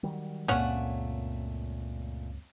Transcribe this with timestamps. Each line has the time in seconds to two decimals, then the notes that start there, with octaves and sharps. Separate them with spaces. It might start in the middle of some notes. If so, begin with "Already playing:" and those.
0.03 D#3 F#3 G3
0.48 C#2 F#2 A#2 A3 C4 C#4 C#5 F#5